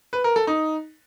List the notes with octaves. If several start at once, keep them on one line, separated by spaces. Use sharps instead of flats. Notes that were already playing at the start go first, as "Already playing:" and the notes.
B4
A#4
A4
D#4